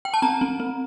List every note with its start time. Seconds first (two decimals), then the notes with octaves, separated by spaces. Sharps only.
0.05 G5
0.14 A5
0.22 C4 A#5
0.41 C4
0.60 C4